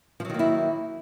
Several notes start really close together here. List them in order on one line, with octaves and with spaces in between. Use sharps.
F3 F#3 D#3 A#3 E4